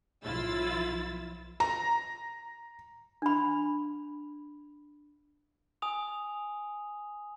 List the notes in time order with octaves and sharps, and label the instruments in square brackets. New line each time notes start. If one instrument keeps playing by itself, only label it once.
[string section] B1 F3 E4 F4 E6 A6
[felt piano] A#5
[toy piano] D4 B5
[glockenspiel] G#5 D#6 F7